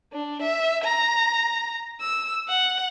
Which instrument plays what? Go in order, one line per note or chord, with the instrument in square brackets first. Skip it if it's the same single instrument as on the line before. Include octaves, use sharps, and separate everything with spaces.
[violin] D4
E5
A#5
E6
F#5